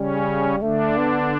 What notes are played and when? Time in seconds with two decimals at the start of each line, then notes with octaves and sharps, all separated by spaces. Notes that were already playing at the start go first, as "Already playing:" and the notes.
Already playing: C#3 G3 C#4
0.62 D3 A3 D4
0.97 B3